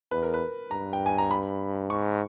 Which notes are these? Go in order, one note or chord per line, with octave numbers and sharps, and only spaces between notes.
E2 B4
A#4
B4
G2 A#5
G5
G#5
A#5
B5
G#2 C#6